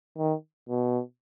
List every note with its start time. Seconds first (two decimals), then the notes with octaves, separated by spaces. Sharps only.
0.18 D#3
0.69 B2